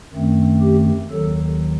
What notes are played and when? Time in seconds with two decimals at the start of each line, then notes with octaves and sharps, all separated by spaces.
0.13 F#2 D#3 A3 C4
0.61 G4
1.11 D#2 D#3 F#3 A4